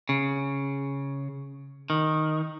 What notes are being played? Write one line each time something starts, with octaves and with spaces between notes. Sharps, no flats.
C#3
D#3